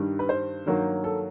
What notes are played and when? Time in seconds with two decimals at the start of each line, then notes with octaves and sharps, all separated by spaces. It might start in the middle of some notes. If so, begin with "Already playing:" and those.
Already playing: G2 D#3 G3
0.19 B4
0.29 C5
0.66 G2 D#3 F#3 A#3
1.04 A4